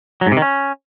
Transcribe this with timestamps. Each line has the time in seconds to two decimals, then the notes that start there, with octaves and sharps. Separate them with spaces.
0.21 F#3
0.26 G#2
0.32 C3
0.37 D#3
0.42 C#4